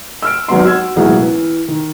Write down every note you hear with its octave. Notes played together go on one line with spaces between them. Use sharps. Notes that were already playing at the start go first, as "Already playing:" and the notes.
E6 F6 D7
G#1 F#3 B3 C6
F#4 E6 G#6
E1 A1 D#2 F#3 G#4 F#5
E3
D#3